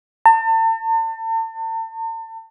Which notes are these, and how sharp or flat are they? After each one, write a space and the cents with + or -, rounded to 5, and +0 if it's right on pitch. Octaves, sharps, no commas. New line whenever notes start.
A5 +40